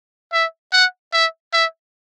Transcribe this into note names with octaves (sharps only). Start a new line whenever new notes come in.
E5
F#5
E5
E5